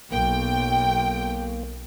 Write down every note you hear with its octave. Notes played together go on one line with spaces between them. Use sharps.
B1 A#3 G5